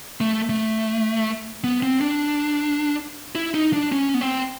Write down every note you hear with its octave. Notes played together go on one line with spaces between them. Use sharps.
A3
A3
B3
C4
D4
E4
D#4
D4
C#4
B3
C4